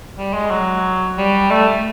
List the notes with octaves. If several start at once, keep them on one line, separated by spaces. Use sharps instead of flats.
G3
G#3
F#3
G3
A3